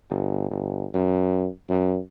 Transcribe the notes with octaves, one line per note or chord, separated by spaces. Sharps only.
G1
G1
F#2
F#2